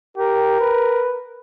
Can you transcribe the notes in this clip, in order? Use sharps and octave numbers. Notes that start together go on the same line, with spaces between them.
G4 A#4
B4